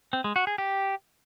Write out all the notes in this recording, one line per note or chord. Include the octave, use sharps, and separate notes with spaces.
C4
G#3
F#4
G#4
G4